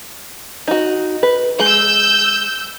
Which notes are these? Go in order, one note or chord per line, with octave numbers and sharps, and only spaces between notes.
D#4 F#4
B4
G#3 E6 G6